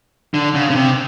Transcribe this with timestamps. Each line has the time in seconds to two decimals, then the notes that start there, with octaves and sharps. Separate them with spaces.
0.34 D3
0.55 C#3
0.70 C#3
0.75 C3